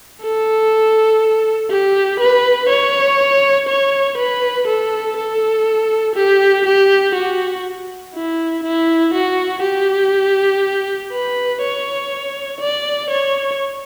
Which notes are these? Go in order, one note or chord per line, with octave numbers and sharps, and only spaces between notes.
A4
G4
B4
C#5
C#5
B4
A4
A4
G4
G4
F#4
E4
E4
F#4
G4
B4
C#5
D5
C#5